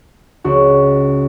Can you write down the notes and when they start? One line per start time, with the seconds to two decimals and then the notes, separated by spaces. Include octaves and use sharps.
0.44 C#2 F#4